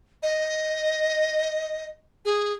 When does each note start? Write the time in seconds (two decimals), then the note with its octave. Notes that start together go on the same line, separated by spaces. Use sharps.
0.23 D#5
2.25 G#4